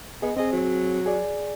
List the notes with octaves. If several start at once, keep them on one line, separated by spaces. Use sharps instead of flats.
B3 G#4 D#5
C4 G#4 D#5
F#3
G#4 D5